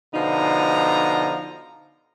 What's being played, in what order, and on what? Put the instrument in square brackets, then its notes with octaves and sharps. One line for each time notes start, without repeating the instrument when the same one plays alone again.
[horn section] B2 D3 F3 D#4 A#5